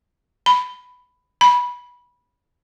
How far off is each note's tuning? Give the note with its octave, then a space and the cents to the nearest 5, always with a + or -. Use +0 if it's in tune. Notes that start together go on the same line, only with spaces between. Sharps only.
B5 +10
B5 -15